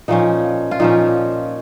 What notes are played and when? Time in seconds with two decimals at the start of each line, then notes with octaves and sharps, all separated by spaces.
0.08 A#2 F3 C#4 D#4
0.71 F4
0.80 A#2 F3 C#4 D#4